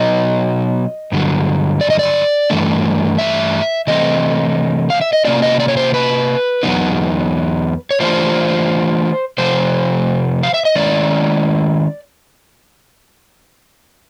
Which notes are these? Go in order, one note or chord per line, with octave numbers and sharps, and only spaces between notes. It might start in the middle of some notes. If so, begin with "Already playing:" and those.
Already playing: B2 F#3 B3 D#4 D#5
G2 D3 F#3
D5
D#5
D5
G2 E3 A3 D4
E5
C3 E3 A3 C4 D#5
F5
E5
D#5
C3 F3 A#3 C#4 F4 D5
D#5
D5
C#5
C5
B4
E2 C#3 F#3 B3 D#4
C#5
E3 A3 D4 F4 C5
C3 F3 A3 C5
F5
E5
D#5
D#3 G#3 C#4 E4 D5